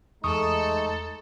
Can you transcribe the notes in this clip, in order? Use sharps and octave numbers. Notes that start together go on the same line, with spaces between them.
E2 G#3 A3 D#4 A4 C#6 D#6